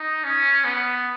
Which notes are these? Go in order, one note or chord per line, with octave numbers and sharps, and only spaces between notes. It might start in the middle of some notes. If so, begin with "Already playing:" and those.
Already playing: D#4
C#4
B3